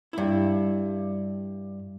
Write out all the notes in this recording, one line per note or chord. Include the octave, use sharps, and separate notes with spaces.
G2 E4